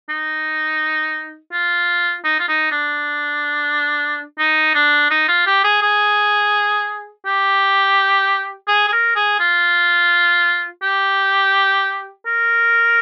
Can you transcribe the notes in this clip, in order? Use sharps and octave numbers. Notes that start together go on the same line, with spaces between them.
D#4
F4
D#4
F4
D#4
D4
D#4
D4
D#4
F4
G4
G#4
G#4
G4
G#4
G#4
A#4
G#4
F4
G4
A#4